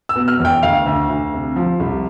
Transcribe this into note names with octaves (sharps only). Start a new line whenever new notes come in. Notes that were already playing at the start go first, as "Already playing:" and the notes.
E6
B2
F6
E2
G5
D2 F5
D2
D2
C3
F3
C2